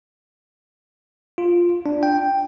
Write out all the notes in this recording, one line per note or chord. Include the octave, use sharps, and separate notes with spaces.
F4
D4
G5